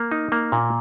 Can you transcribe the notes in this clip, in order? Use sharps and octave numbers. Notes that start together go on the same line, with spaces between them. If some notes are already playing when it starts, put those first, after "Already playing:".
Already playing: A#3
D#4
A#3
A#2